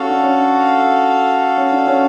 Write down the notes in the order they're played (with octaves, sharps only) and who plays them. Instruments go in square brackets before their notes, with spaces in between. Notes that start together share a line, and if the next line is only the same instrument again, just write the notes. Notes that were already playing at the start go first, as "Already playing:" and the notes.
Already playing: [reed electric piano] C#4 [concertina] F#4 A4 F5
[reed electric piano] D4
C#4
C#4
D4
C#4